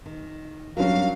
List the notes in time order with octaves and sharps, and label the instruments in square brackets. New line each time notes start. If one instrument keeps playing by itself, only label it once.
[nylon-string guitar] D#3
[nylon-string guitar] F#3 G3 [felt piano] C#4 D4 A#4 [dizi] F5